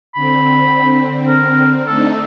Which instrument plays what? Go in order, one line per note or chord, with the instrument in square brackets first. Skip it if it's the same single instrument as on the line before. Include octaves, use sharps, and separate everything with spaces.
[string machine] D3 C4 [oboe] B5
[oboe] A#4
[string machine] A3 D4 D#4 [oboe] A4